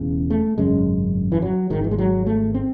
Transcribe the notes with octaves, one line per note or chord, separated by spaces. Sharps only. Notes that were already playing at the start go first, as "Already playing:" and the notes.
Already playing: E1 E2 C#3
A3
G#1 F#2 C#3 G#3
E3
F#3
G#1 G#2 D#3
E3
G#3
F#3
A3
C4